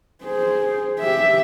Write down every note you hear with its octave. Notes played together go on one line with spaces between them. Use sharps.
G#4 C5
G4 E5